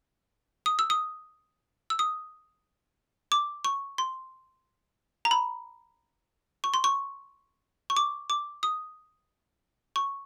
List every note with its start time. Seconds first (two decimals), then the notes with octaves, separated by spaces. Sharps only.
0.66 D#6
0.79 E6
0.90 D#6
1.90 E6
1.99 D#6
3.32 D6
3.65 C#6
3.98 C6
5.25 A#5
5.31 B5
6.64 C#6
6.74 C6
6.84 C#6
7.90 C#6
7.97 D6
8.30 D6
8.63 D#6
9.96 C#6